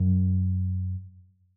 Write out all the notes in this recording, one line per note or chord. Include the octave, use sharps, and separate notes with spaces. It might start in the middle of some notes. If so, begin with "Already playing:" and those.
Already playing: F#2